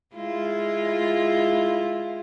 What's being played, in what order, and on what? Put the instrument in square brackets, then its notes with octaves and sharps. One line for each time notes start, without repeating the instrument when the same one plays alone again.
[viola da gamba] G#3 E4 F4